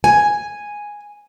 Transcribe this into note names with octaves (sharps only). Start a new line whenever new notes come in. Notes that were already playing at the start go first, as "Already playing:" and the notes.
G#5